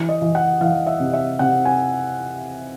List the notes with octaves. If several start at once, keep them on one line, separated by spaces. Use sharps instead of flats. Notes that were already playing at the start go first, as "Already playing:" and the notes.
Already playing: E3
D#5
E3
F#5
E3 F5
E5
C3
E5
C3 F#5
G#5